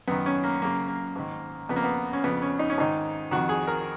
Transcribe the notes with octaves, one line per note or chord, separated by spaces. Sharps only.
F#2 D#3 B3
C#4
A#3
F#2 C#3 A#3
A#3
G#2 D#3
F2 C#3 B3
A#3
B3
C#4
F2 C#3 B3
C#4
D#4
C#4
G#2 D#3 D#4
F2 D#3 F#4
G#4
A#4